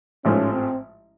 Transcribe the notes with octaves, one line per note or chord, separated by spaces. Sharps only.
A1 G#2 F3 A3 C#4
C4